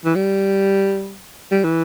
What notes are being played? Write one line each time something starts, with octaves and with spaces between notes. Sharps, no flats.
E3
G3
G3
E3